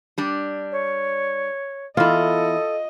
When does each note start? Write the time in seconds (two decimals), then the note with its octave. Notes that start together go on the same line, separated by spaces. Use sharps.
0.18 G3 D4
0.72 C#5
1.97 E2 E4 F4 A4 D#5